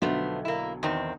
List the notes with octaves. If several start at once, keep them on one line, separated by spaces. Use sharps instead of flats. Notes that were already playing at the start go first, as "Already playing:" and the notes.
B1 D3 F3 F#3 A3 B3
A#3 E4
E2 D#3 C4